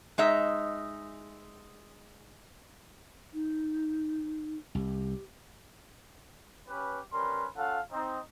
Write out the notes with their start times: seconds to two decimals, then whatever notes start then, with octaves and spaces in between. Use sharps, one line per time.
0.18 G#3 D#4 E5
3.33 D#4
4.75 C2 G4
6.69 C#4 G4 B4
7.13 G3 C#4 A#4 B4 C6
7.56 C#4 F4 A4 F5 F#5
7.92 C4 D#4